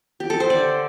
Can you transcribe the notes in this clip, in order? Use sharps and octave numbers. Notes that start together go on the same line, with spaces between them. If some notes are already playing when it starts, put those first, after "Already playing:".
G4
A4
C5
D3 D5